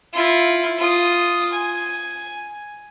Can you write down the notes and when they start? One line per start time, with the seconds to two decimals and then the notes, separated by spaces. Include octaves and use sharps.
0.14 E4 F4
0.79 F4 D#6
1.53 G#5